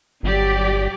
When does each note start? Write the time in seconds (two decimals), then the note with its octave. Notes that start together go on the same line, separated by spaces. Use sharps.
0.23 G1 F#3 G4 D5